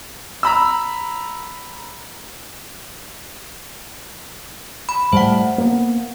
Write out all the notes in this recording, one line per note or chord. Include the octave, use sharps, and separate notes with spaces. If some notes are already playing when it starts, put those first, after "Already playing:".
A#5 B5 E6
B5
A2 G3 A3 C5 F#5
A#3 B3